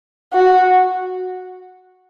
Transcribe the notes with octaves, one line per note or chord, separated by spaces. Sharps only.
F#4